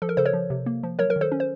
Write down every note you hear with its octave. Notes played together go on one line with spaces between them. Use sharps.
F3 A4
A#4
C#3 A4 C5
A#4 C#5
F3
C3
A#3
F3
F#3 A#4 C#5
A#4
D#3
A4 C5
C#4
C5